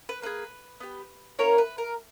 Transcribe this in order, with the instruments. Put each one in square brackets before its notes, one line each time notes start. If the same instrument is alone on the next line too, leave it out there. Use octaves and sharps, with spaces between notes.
[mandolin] B4
A#3 D#4 G#4 B4
B3 G4
A#3 C#4 E4 A#4 C#5
B4
A#4